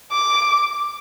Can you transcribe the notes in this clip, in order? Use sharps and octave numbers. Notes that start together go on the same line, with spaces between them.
D6